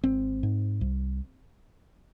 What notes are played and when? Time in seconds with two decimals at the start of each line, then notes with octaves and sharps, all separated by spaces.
0.04 G#1 C4
0.43 G#2
0.81 C2